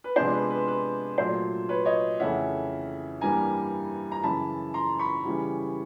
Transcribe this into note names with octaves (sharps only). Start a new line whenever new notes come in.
B4
C3 F3 G#3 B3 D4 C5
B4
B4
B4
A#2 F#3 A3 C5
B4 C#5
C#5 D#5
F2 C#3 E3 A3 C#4 E5 F#5
G2 E3 G3 A#3 G#5 A#5
A#5
F#2 C#3 E3 A5 B5
A#5 C6
B5 C#6
C#3 E3 G3